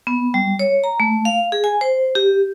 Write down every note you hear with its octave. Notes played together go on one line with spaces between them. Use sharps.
B3
G3
C#5
A#5
A3
F5
G#4
G#5
C5
G4